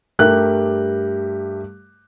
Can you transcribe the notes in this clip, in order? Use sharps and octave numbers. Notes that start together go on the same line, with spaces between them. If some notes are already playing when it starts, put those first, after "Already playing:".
G2 G3 A3 G4 A#4 F#6